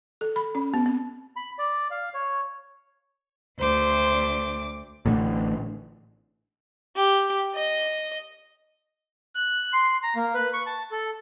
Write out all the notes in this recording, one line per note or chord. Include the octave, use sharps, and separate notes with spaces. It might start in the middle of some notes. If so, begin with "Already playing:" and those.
A4
B5
C#4
B3
C4
B5
D5
F5
C#5
D2 C5 D6
A1 A2 D3
G4
D#5
F#6
C6
A#5
A#3
B4
C#6
A5
A4